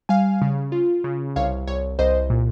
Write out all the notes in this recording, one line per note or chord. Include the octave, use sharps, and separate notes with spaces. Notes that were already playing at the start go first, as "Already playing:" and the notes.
G3 F5 G#5
C#3
F4
C#3
C2 C#5 F5
C2 C#5
C2 C5 D#5
A#2